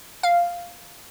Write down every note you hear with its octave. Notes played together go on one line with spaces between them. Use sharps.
F5